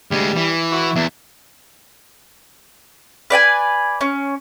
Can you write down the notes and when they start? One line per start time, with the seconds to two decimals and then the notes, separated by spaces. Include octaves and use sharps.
0.11 D2 G3 G#3
0.36 E3
0.72 E4 F#4 C#6
0.96 E2 E3 E5
3.30 B4 D5 G5 G#5
4.01 C#4